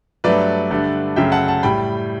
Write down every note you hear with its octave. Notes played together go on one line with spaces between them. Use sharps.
G2 F#3 A3 B4 D5
G2 D3 A3
F#2 C#3 F#3 A3 E5 G5
F#5 A5
F#5 A5
A2 G3 G5 B5